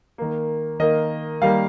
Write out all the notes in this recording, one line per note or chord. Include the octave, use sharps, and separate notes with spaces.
D#3 A#3
D#3 A#3 D#5
D#3 G3 A#3 F5